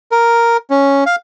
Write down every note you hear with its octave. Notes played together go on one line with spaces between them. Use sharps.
A#4
C#4
F5